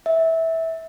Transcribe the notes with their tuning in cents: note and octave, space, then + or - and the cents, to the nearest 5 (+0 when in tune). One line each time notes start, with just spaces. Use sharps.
E5 -15